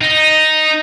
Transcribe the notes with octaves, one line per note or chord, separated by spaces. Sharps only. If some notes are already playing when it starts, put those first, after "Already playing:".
D#4